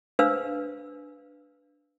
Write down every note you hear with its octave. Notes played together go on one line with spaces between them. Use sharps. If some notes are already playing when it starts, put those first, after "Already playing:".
D4 B4 C5 F5 E6